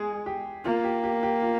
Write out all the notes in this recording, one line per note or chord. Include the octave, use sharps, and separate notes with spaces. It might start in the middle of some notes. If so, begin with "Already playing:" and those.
Already playing: G#3 G#4
G4
A#3 F4
G4
G4
G4
F4